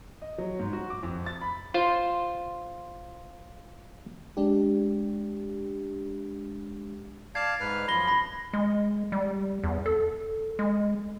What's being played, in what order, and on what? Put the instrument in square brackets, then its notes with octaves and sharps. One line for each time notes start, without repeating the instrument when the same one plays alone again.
[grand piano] D#5
F#3
G#2
F#4
D6
F2
A6
B5
[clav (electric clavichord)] F4 C5
[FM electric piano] G#3 D4 G4
[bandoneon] D5 F5 A5 [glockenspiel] G#6 C7
[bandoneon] G#2 B4 F6
[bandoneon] F#2 F3 [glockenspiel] B5 A#6 G7
[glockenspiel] B5 A#6
[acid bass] G#3
G3
E2
A4
G#3